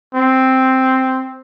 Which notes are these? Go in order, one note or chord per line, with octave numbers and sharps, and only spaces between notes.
C4